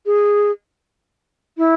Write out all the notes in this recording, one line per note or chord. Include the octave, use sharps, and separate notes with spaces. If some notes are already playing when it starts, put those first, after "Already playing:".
G#4
E4